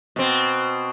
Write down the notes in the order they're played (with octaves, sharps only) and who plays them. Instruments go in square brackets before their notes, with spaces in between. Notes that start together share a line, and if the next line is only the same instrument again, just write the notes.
[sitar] B2 C4